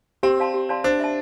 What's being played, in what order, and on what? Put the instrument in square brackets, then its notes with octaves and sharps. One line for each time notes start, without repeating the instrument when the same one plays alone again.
[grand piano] C4 [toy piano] G4
[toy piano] D5 F5 A5 C6
G4
D5 F5 A5 C6
[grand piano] D4 [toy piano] C5
[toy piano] E5 A5